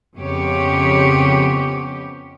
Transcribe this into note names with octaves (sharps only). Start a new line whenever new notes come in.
F2 C#3 B3 G4 C#5